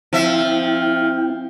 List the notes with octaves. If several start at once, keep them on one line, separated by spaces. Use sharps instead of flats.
F3 C4 E4 E5 G5